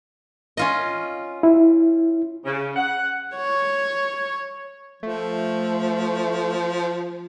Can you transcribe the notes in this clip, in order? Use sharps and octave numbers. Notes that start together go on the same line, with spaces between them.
C#4 F4 D#5
E4
C#3
F#5
C#5
F3 A3